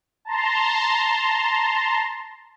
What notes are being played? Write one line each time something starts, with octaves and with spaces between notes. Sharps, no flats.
A5 A#5 C6